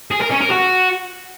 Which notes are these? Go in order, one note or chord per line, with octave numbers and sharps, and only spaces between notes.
G#4
A#4
C#4
A#4
F#4